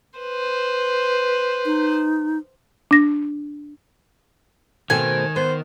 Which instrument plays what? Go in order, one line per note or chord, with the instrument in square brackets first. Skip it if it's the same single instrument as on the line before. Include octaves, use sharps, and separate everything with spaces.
[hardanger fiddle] B4 C5
[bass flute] D#4
[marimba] D4 A#6
[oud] B2 A3 C4 [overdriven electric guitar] D#3 [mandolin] G#5
[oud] B3 [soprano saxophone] C5